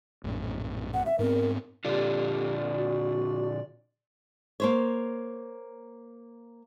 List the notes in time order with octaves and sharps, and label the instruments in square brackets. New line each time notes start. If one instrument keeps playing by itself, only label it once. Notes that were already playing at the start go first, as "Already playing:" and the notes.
[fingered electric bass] A#1 F#2 A2
[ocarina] F#5
E5
[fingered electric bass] G#2 B3 C4 [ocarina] A#4
[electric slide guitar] A#2 D3 F4 [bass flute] G4 [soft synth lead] D5
[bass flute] F#4
[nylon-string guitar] A#3 C5 C#5